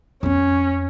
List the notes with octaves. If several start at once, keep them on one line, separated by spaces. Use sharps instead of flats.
F2 C4 C#4